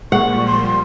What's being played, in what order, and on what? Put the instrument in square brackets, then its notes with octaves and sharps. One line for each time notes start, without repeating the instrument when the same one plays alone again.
[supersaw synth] A#2 F3 G3 [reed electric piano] G#3 A#3 [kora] F#5 [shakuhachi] C#6
[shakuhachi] C6